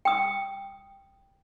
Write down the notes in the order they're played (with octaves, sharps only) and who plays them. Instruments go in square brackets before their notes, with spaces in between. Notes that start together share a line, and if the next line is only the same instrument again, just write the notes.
[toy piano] G5 D#6